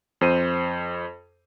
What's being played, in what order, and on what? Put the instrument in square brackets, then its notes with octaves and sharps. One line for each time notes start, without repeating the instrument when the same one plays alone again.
[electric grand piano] F2 C5 D#7